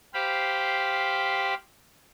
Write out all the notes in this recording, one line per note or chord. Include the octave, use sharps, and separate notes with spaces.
G4 C5 F5 G5 B5